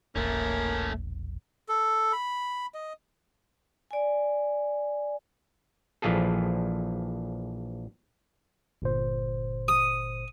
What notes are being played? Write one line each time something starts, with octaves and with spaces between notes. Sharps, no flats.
E1 A#1 A3 A#3 C#4
A4
B5
D#5
D5 G#5
A#1 E3 F3 F4 G#4 A4
G1 A#2 C5
D#6